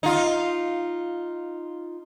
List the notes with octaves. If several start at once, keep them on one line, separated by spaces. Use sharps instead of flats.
D#4 F4